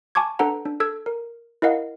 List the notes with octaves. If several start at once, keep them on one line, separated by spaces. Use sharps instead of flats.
G#5 A5 C#6 D6 G#6
D4 A4 B4 F#5 A#5
D4
A4 E6 G#6
A#4
E4 A#4 D#5 F5 F#5